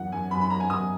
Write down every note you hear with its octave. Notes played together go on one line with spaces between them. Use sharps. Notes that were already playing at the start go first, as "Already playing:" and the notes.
Already playing: F#2 E3 F#5
F#2 G#5
F#2 B5
B5
F#2 A#5
G#5
F#2 D#6